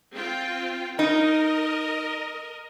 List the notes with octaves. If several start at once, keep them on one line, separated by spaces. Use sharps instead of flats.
C4 F4 G5
D#4 A#4 D#5